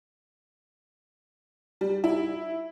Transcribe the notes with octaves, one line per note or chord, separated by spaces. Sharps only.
G3
E4